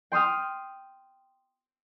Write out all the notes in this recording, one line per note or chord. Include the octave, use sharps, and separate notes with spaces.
G5 C6 D#6 F6